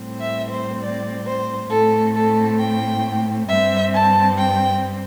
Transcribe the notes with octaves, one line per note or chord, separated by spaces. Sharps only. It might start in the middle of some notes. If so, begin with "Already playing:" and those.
Already playing: A2 G3 C4
E5
C5
D5
C5
A2 A3 C4 A4
A4
G5
G2 G3 C4 E5
A5
G5